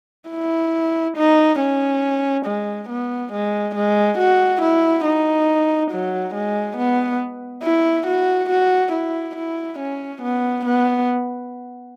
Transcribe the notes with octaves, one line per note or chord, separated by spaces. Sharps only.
E4
D#4
C#4
G#3
B3
G#3
G#3
F#4
E4
D#4
F#3
G#3
B3
E4
F#4
F#4
E4
E4
C#4
B3
B3